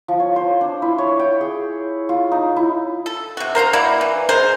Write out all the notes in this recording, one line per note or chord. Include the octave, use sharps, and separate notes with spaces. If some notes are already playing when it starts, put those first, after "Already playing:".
F3
C#5
C5
D4
E4
C#5
G5
G#4
F4
D#4
E4
A4
C3 F#4
A#4 C5 F5 A#5
A#3 E4 F#4 D5
E3
G#3 A#4 C5